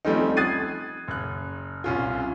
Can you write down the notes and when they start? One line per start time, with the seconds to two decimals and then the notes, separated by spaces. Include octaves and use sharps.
0.05 F3 G3 A3 C4 C#4 D#4
0.37 D#6 F#6 G#6 A6 C7 D#7
1.08 F#1 F#6
1.84 C2 C#4 F4